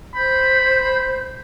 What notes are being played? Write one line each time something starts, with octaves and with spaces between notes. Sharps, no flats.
C5 B5 G6